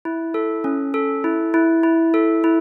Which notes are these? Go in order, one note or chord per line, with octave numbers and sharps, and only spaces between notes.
E4
A4
C#4
A4
E4
E4
E4
A4
E4